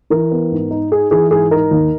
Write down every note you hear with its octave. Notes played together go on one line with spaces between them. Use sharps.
E3 A#4
B3
G#2
D#4
D#4 G#4
E3 G#4
G#2 G#4
D#4 A#4
D#2